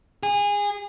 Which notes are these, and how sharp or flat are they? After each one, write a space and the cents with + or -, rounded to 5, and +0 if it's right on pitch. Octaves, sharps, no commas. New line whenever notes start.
G#4 -25